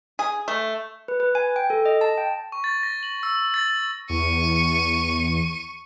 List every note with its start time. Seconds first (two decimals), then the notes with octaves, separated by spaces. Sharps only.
0.19 G#4
0.48 A3
1.08 B4
1.20 B4
1.35 G#5
1.56 G5
1.70 A4
1.85 D#5
2.01 A5
2.18 G5
2.52 C#6
2.64 A6
2.83 A#6
3.03 F#7
3.23 E6
3.54 A6
4.10 E2 C#6 D#7